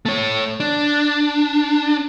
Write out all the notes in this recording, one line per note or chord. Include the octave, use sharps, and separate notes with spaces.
A3 C#5
D4